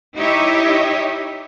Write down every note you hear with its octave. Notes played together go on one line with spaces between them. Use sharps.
D#4 E4 G4 C#5 D#5 E5